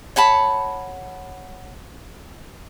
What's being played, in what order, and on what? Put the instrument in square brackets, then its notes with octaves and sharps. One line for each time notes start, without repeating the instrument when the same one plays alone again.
[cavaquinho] C#5 F#5 A5 B5